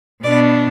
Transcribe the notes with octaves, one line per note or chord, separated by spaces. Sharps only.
B2 B3 D4 D5